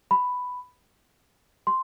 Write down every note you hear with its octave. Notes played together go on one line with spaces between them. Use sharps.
B5
C6